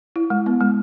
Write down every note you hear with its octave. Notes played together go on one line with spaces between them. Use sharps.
E4
G#3
B3
G#3